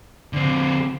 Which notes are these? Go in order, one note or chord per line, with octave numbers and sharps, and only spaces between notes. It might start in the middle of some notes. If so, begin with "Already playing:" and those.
D3 C4